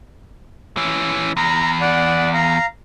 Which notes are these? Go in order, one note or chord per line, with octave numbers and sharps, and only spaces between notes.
E3 C#4
E2 A#5
D5 F#5
F5 A#5